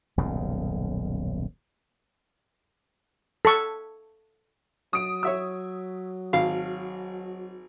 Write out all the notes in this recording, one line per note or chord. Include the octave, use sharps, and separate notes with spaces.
D#1 B1 F#2 C#3
A4 C#6
F#3 D#6 D7
C#5 E5 E6
G#1 F5